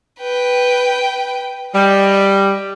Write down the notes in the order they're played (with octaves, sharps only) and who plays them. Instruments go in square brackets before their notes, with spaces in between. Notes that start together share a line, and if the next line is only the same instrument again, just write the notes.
[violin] B4 G5
[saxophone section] G3 [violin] D#5